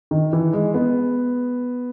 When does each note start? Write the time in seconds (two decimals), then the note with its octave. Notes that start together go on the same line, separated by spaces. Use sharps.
0.11 D#3
0.33 E3
0.53 G#3
0.74 B3